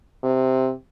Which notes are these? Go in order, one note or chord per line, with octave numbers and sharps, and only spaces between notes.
C3